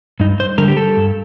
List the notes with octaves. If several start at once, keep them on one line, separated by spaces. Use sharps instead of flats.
G2 D#4
C5
D3 G3 A#4
G4
A4
G2